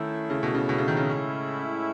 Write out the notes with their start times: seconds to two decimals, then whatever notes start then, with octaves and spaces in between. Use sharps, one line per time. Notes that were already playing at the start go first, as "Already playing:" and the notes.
Already playing: D#3 A3 C#4 E4
0.30 C#3
0.43 B2
0.55 C#3
0.69 B2
0.78 C#3
0.88 D#3
0.97 C#3
1.07 A2 G#3 C#4 E4